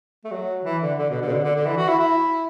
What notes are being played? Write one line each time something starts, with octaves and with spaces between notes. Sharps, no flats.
A3
F#3
E3
D3
D3
B2
D3
B2
D3
D3
D3
E3
F#4
E4
E4